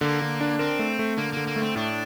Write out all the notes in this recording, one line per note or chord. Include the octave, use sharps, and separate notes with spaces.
D3 A#3
D3
D4
C4 A#4
A3
A3
D3 A#3
D3 A#3
A#3
A3
C4
A2 D4